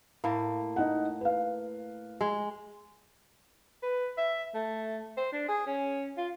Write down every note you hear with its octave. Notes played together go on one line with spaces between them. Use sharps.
A2 A#3
D#4 F#5
B4 F5
G#3
B4
E5
A3
C5
D4
G#4
C#4
F4